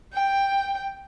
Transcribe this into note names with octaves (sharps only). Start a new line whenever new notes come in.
G5